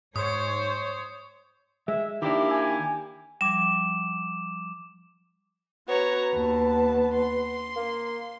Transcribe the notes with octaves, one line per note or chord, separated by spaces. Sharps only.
G#2 C5 C#5 D#6
G#3 E5
D#3 A#3 D4 E4 G4 E5
G#5
F3 G3 D6 E7
B3 F#4 C#5 A#5
D#2 A5
C6
A#3